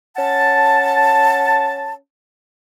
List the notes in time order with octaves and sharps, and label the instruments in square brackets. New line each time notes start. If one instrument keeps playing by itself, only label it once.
[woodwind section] C#4 F#5 A5